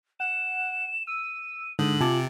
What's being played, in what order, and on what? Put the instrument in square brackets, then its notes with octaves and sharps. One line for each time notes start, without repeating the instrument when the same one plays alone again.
[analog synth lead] F#5 [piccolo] E7
[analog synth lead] E6 [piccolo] D#7
[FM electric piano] G#2 [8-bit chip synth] D3 [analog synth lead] D#6 [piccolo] F#7
[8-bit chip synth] C3 [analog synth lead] F4 [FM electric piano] G#5 A5 D6